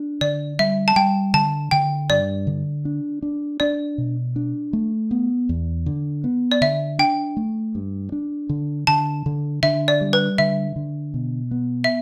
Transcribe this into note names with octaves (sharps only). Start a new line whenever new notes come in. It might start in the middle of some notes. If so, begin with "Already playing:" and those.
Already playing: D4
D3 D5
G3 E5
A5
G3 G5
D3 A5
D3 G5
G2 D5
D3
D4
D4
D4 D5
B2
D4
A3
B3
E2
D3
B3
D5
D3 E5
D4 G5
A3
G2
D4
D3
D3 A5
D3
D3 E5
D5
G3
B4
D3 E5
D3
B2
B3
E5